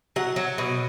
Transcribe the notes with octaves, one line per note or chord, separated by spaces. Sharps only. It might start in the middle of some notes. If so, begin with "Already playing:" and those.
F#3 F#5
F#3
B2